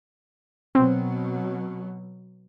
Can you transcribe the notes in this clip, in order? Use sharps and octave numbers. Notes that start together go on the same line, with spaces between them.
B2 F#3 C4